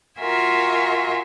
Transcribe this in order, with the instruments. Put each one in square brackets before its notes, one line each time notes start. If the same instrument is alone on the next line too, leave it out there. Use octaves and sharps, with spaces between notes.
[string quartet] F4 F#4 A#4 E5 G#5